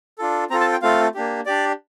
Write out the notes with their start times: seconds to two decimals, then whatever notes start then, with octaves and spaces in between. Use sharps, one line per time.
0.18 D4 F4 A4
0.50 C4 F4 A4 A#5
0.61 A5
0.72 G5
0.82 A3 C4 F4 A4 F5
1.15 A#3 D4 G4
1.46 D4 G4 D5